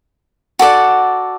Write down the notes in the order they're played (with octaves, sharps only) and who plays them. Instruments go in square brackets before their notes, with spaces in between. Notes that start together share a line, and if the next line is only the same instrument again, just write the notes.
[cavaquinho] F#4 A4 D5 F#5